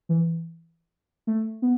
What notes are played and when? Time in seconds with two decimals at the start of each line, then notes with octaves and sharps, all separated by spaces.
0.09 E3
1.27 A3
1.62 B3